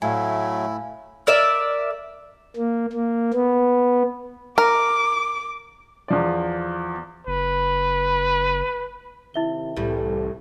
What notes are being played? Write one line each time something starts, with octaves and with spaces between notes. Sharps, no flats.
A2 F#3 A3 E4 F5 G#5
A#4 D5 E5
A#3
A#3
B3
A#4 D6
E2 F3 D5
F#1 B4
C3 D#3 E4 E5 G7
C2 A2 E3 G3 G4 A4